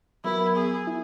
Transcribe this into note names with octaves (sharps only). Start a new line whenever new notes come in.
F#3 B3 E4 F#4 A#4
G#4
E4